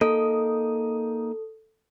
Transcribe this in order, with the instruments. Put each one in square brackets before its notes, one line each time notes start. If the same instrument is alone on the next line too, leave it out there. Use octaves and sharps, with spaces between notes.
[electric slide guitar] A#3 D#4 D#5 [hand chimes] A4